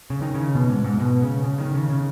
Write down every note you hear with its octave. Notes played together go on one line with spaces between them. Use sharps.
C#3
D#3
C#3
B2
G#2
G#2
B2
C#3
C#3
D#3
C#3
C#3